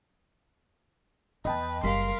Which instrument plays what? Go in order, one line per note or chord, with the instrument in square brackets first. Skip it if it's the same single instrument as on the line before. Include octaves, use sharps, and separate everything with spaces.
[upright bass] E2 [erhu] B4 [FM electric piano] D#5 G5 A5
[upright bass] F#1 [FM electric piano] G3 B6 [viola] A#4 F5 [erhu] C6